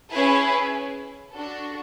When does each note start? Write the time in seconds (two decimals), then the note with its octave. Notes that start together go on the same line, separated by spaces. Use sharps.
0.10 C#4 E4 G#4 B4
1.32 D4 F#4 A4